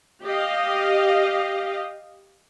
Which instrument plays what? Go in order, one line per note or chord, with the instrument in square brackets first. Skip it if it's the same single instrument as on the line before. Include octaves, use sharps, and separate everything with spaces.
[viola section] G4 D#5 F5